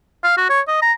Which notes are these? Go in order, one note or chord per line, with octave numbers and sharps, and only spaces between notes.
F5
F#4
C#5
D#5
A#5